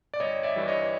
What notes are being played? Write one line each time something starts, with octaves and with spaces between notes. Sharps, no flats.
D5
G1 C#5 D#5
D5 E5
G2 E3 G3
C#5 D#5